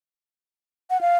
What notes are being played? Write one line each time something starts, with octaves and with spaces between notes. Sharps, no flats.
F#5
F5